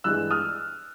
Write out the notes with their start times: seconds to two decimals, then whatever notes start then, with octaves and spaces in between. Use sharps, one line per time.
0.04 G2 E3 G#3 E6 F#6
0.31 D#6 F6